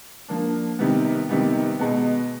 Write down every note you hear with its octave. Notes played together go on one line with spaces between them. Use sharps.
F3 A#3 D4
C3 D#3 G3 B3
C3 D#3 G3 B3
B2 G#3 B3